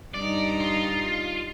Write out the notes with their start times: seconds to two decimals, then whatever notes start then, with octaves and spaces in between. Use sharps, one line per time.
0.14 G2 G3 D#4 D5
0.61 F4